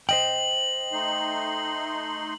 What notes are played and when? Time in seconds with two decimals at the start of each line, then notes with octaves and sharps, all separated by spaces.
0.09 C5 D#5 G5 F#7
0.92 A3 D#4 C6